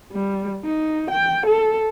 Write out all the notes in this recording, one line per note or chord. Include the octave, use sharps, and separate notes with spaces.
G3
D#4
G5
A4